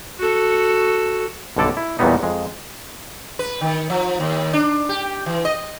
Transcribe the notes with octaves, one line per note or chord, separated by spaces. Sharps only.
F#4 A4
B1 G2 D3 A4 D5
E4
E2 A#2 F#3 G3 B3 D#4
F2 G#3
B4
D#3
F3
D#2
D4
G4
E3
D#5